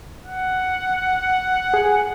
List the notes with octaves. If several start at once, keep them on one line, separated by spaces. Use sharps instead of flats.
F#5
G#4 G#5